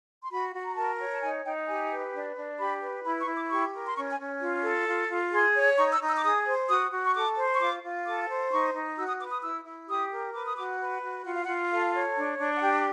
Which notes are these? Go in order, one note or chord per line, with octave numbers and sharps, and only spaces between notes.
C6
F#4 B5
F#4
A#5
A#4 A5
C#5
A5
D#4 G#5
D#4 G5
G4 G#5
B4
D4
D4
G4 B5
B4
E4 B5
C#6
E4
D6
G4 C#6
A#4
C6
C#4 C#6
G#5
C#4
F4
A4
F4
F4
G#4 C6
C#5
D#4 C#6
E6
D#4
E6
D6
G#4 D#6
C5
F#4 D#6
F#4
C#6
A4 D6
C5
C#6
F4 D6
F4
A4 D6
C5
D#4 C#6
D#4
F#4 E6
D#6
B4 D6
D#6
E4 E6
E4
G4 D#6
A#4
B4 D6
D#6
F#4 D6
B4
F#4
F4 F#5
F5
F#5
F4
A4 F5
C#5
D4
D4
F#5
G4 G5